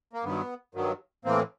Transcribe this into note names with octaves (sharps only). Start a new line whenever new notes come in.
A#3
G2 D#3 F#3 B3
G2 D#3 F#3
A2 E3 A#3 C4